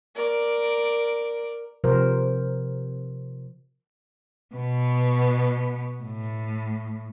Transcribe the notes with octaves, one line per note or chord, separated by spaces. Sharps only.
A#4 D5
C3 F3 A#4 C5
B2 B3
A2